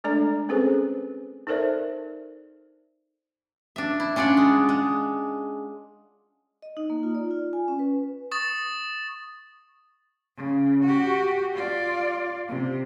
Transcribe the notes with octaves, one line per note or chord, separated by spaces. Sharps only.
G#3 A3 D4 A4 D5 A#5
C4 C#4 G#4 A4 B4 C5
D#4 A4 A#4 C5 D5 E5
D4 E5
E4
C#4 D4 F4 D5 F#5
G#3
G#3
D#5
D#4
A#3
F4
D5
F4
G#5
C#4
B4
C#6 D#6 A6
C#3
F#4 G4
F4 D5
C3